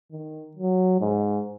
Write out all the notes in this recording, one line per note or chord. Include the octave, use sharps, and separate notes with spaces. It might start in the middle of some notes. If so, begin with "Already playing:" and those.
D#3
F#3
G#2